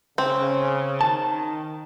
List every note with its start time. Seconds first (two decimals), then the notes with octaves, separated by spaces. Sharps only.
0.18 C#3 C4
1.01 D#3 A5